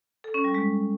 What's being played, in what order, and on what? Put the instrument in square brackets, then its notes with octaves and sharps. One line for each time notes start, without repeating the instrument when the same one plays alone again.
[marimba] A4
C#4
G3
G#3